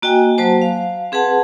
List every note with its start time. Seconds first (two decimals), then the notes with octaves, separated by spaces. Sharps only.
0.02 A#3 F#4 D#5 G5 G#5
0.38 F#3 A#3 F#4 C5 A5
0.62 F5
1.12 C4 G#4 B4 F#5 A5